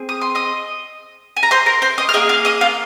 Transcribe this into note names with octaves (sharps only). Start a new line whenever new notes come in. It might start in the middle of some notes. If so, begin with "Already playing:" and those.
Already playing: C4 G#4
D#6
C6
D#5 D#6
G#5
A#5
C5 C6
A#4 A#5
C5 C6
D#5 D#6
F6
A#3 F4 G#4 D#5 D#6
F5 F6
D#5 D#6
F4 F5